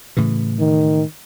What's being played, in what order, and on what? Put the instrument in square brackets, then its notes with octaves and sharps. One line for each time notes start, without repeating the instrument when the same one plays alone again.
[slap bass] A2 C#3 E3
[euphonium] D#3